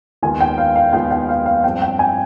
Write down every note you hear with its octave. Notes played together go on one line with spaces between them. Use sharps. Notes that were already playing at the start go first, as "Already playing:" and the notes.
D#2 D#3 G#3 B3 F4 G#5
G5
F5
F5
D#2 D#3 G#3 B3 F4 G5
G5
F5
F5
G2 F3 C4 G5
G5
G#5